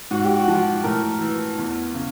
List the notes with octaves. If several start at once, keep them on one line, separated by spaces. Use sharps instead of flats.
G#2 F#4
G4
F#4
F3
A2 A#4
E3
E2
C#3